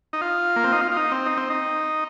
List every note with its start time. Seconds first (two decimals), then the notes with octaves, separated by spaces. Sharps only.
0.13 D#4
0.21 F4
0.56 A#3
0.64 C4
0.72 D#4
0.81 F4
0.92 F4
0.97 D#4
1.11 C4
1.26 D#4
1.37 C4
1.50 D#4